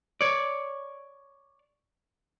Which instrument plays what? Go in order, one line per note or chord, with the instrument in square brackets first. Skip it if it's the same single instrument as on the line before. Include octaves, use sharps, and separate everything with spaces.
[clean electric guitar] C#5 D5